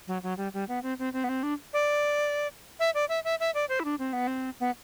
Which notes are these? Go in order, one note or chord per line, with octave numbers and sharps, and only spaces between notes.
F#3
F#3
G3
G3
B3
C4
C4
C4
B3
C4
D4
D5
E5
D5
E5
E5
E5
D5
C5
E4
D4
C4
B3
C4
B3